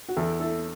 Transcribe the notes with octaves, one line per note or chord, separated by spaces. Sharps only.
F#4
E2 E4 A4
E4 A4